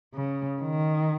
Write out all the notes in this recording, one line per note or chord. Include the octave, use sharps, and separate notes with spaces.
C#3
D#3